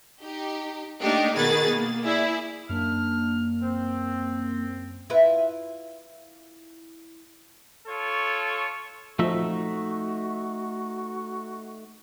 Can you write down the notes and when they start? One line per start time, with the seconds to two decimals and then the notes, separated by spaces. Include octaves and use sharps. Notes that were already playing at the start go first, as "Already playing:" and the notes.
0.22 D#4 G4
1.03 A3 A#3 D4 D#4 G4
1.36 B2 D#3 F#4 G#4 B5 A6
1.74 A#3
2.05 E4 G#4 D5
2.69 F#2 A#3 D4 F6
3.62 C4
5.10 E4 F4 B4
7.87 F4 A4 C#5
9.19 F3 A3 D#4 F#4 E5